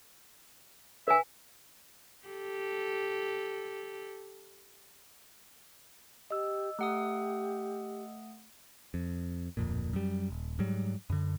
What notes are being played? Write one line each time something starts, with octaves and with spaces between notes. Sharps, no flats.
B4 E5 G#5
G4 A4
G4 D#5 E6
A3 G4 F#5 D#6
F2
D1 F2 A#2
F#2 G3
D#1
G#2 F#3 G3
F#2 D3